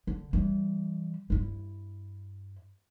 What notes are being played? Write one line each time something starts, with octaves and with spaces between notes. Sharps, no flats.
D3
E3 G3
G2 E4